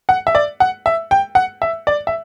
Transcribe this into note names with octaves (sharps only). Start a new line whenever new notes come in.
F#5
E5
D5
F#5
E5
G5
F#5
E5
D5
E5